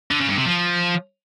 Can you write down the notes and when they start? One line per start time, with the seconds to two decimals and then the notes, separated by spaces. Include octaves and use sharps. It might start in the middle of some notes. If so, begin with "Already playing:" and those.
0.11 D3
0.20 C#3
0.29 G2
0.38 C3
0.46 F3